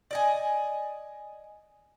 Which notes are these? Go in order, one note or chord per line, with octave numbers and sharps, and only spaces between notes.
D5 D#5 G#5